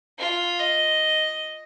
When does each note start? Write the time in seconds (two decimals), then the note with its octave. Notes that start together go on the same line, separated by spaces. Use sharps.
0.19 F4
0.59 D#5